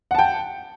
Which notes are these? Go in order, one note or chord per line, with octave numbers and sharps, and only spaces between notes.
F#5 G5 A5